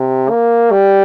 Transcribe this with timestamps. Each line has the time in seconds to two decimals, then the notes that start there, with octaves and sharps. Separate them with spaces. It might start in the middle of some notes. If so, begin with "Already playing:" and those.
Already playing: C3
0.30 A#3
0.71 G3